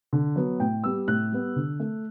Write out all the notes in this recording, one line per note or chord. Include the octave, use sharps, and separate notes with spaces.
D3
F#3 B3
A2 G5
G3 B3 E6
A2 F#6
G3 B3
D3
A3